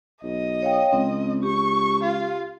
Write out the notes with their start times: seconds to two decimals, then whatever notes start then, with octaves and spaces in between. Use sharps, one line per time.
0.23 B1 D#5
0.62 C#5 F5 G5
0.93 C#2 C4
1.43 G4 C#6
2.03 F4